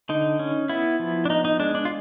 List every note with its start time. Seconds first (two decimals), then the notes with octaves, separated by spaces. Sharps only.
0.09 D3 D#4
0.39 C#4
0.69 B3 E4
0.99 F3
1.25 D4
1.30 B3 D#4
1.45 D#4
1.60 G#3 D4
1.75 D4
1.85 F4